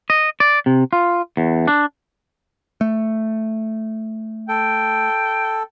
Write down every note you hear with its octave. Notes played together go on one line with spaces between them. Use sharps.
D#5
D5
C3
F4
E2
D4
A3
A4 G5